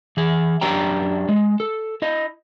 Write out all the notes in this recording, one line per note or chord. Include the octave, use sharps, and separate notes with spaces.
E3 G#4
F#2 D4 G4 C#5 G5 A#5
G#3
A4
E4 D#5